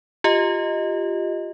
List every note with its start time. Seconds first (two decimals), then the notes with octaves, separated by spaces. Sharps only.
0.24 F4 G4 D#5